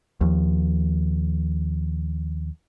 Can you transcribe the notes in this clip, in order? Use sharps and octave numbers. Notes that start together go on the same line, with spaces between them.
D#2 F3